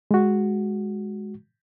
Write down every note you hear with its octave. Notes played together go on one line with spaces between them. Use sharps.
G#3 F#4